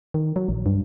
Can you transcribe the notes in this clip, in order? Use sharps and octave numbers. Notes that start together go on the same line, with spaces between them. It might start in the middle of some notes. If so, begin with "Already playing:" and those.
D#3
F#3
A#1
G2